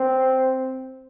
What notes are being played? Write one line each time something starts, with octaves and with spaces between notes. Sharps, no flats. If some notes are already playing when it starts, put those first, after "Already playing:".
Already playing: C4